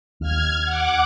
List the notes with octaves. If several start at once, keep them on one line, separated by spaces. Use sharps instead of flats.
D#2 F6 G#6
F#5 D6